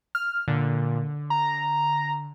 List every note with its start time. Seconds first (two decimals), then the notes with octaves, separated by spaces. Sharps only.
0.15 F6
0.48 A#2 D3
1.30 A#5